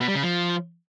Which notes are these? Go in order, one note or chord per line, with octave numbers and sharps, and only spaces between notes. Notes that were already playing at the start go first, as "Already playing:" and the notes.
B2
G3
C#3
F3